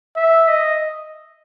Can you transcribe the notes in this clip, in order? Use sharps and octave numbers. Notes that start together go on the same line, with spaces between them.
E5
D#5